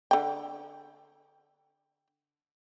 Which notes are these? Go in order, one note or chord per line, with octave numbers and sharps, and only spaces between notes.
D3 G5